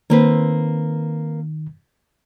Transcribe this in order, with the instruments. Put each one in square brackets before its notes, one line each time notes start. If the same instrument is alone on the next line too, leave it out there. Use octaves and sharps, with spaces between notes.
[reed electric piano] D#3 [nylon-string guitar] A#3 C4 B4